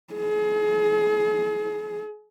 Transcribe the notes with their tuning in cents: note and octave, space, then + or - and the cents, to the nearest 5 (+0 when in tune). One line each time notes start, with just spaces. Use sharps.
G#4 +35